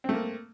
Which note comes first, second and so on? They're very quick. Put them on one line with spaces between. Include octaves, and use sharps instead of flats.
C4 A3 A#3